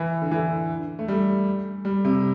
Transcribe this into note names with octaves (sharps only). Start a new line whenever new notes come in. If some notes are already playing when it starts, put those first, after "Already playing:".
Already playing: E3
D3
E3
A3
G3
G3
C3